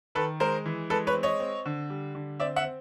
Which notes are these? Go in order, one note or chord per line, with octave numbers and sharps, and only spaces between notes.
D#3 A4 B4
G#3 A#4 C5
E3
G#3 A4 B4
B4 C#5
C4
C#5 D#5
C4
D3
G3
D3
C4 D5 E5
E5 F#5
C4